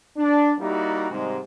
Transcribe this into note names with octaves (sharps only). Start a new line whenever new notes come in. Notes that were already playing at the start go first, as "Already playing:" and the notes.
D4
G3 A#3 D#4 E4 F#4 G4
G#2 C3 D#3 G3 G#3